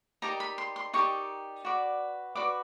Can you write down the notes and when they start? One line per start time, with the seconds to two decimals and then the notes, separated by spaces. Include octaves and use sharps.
0.22 D#4 G4 A#4 D5 A#5
0.40 B5
0.58 C6
0.76 C6
0.94 D#4 G4 A#4 D5 C#6
1.65 F#4 B4 D5
2.35 F#4 B4 D5 D6